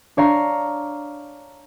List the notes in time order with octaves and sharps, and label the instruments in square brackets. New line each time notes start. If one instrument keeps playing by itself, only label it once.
[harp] D4 C#5 F5 A#5